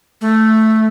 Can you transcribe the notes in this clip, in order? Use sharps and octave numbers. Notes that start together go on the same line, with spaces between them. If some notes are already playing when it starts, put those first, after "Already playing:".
A3